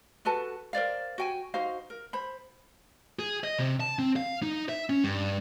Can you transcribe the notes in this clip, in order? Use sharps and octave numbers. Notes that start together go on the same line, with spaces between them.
F#4 A4 B4 A5
A#4 C5 D5 F5
F#4 G5 G#5
D#4 F#4 C5 F5
A#4
C5 B5
G#4
D#5
C3
A5
C4
F5
D#4
E5
C#4
G2